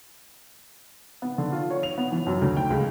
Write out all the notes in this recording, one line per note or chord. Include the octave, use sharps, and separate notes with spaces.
B3
D3
F4
C#5
F7
B3
E3
F#2
D2
G5
C#2